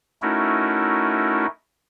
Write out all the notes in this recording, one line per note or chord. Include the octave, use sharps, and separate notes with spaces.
A3 C#4 D#4 E4 F#4 A#4